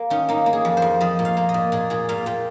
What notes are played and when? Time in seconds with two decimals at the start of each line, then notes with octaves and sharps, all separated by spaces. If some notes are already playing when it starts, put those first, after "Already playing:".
Already playing: A#3
0.10 D#3 C#4
0.29 A#3 D#4
0.46 A#3
0.53 G#4
0.65 F2
0.77 C5
0.82 F2
1.01 F3 D#5
1.19 A#2
1.25 F5
1.37 A#3
1.49 D#5
1.54 A#2
1.72 A#2 G#4
1.90 A#2 G#4
2.09 A#2 F5
2.26 A#2 G5